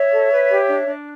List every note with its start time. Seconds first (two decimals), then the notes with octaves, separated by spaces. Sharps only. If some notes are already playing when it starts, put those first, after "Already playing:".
Already playing: C#5 E5
0.11 A4
0.31 B4
0.49 G4
0.68 D4
0.86 D4